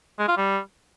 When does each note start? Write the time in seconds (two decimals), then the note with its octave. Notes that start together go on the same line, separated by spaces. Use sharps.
0.19 G#3
0.28 F4
0.37 G3